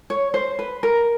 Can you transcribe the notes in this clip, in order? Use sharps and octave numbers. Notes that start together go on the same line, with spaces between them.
C#5
C5
B4
A#4